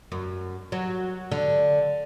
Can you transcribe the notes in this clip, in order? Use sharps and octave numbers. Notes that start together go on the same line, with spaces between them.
F#2
F#3
D3